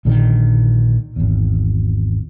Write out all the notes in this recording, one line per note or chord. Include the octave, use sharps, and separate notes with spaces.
A#1 A#2 D3 D#3
G#1 E2